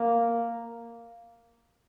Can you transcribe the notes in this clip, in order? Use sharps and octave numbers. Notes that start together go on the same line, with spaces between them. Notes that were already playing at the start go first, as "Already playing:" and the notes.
Already playing: A#3